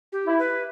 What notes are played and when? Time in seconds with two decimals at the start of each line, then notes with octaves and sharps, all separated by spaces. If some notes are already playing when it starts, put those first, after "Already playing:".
0.12 G4
0.26 E4
0.39 B4